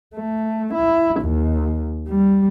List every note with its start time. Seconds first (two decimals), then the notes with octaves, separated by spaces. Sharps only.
0.15 A3
0.74 E4
1.21 D#2
2.09 G3